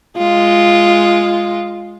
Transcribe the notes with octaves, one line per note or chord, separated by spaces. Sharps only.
G#3 F4